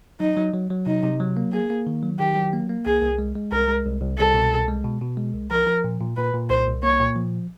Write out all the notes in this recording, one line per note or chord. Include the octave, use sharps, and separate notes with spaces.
F#3 D#4
F#3
F#3
F#3
C3 D#4
C3
F#3
A#3
A#3 G#4
A#3
D#3
F#3
D#3 G4
F#3
A#3
A#3
C2 G#4
C2
G#3
G#3
C2 A#4
G#3
C2
C2
C2 A4
B2
C2
G#3
B2
B2
G#3
C2
F3 A#4
F3
A#2
A#2
A#2 B4
A#2
C2 C5
C2
A#3 C#5
A#2
F3